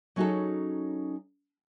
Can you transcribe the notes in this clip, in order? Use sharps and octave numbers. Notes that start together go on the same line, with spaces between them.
F#3 C#4 D#4 F#4 G#4 A4